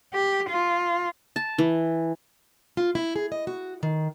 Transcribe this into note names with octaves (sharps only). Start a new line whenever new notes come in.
G4
F4
A5
E3
F4
E4
G#4
D#5
F#4
D#3